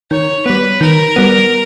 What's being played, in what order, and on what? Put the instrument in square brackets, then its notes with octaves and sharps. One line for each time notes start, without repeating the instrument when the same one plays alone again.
[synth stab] D#3 [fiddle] C#5
[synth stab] G3 B3 [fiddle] B4
[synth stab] D#3 [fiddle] A#4
[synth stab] G3 B3